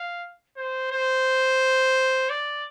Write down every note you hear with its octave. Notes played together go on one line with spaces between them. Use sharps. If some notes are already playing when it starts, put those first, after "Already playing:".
Already playing: F5
C5
C5
D5